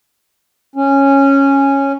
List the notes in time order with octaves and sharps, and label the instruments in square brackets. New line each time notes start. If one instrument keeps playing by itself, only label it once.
[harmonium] C#4